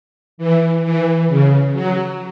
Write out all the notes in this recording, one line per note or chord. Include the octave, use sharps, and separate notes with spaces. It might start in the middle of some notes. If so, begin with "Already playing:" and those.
E3
E3
C#3
F#3